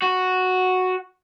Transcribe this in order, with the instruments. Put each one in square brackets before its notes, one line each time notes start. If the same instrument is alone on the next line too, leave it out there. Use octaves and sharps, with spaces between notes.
[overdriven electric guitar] F#4